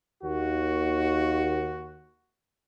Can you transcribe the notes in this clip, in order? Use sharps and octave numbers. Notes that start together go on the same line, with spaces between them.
D#2 F#4